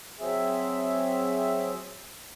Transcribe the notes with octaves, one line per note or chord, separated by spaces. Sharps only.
F#3 C4 G#4 E5